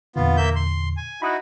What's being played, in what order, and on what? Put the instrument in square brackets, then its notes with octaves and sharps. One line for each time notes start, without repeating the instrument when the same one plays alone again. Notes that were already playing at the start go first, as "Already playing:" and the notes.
[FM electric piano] E2 A#2 D3 [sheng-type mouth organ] B3 F4
[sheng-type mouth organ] A#3 E5 G6
C6
G#5
[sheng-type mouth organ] D#4 E4 F#4 [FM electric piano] B5 D#6 F#6